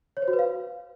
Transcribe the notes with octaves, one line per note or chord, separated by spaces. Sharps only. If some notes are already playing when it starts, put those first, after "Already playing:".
C#5
C5
F#4
B4
F5